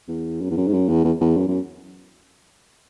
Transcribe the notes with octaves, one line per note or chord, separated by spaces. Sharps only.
E2
F#2
E2
F#2
G#2
F#2
E2
E2
E2
F#2
F#2